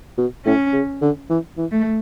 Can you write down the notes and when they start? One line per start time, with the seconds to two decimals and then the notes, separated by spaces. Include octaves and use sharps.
0.18 B2
0.45 A2 C#4
0.73 C#3
1.02 D3
1.30 E3
1.57 E3
1.71 A3